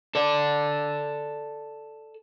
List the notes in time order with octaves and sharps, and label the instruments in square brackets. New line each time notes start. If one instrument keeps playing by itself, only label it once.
[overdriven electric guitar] A4 D5